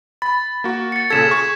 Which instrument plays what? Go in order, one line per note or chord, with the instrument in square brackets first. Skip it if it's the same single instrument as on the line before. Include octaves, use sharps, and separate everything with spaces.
[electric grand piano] B5 [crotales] A6
[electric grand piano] A#3 F#4
[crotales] A6 C#7
[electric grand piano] A#2 C#3 A4 [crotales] G#6 B6 E7
[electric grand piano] G#4 C#6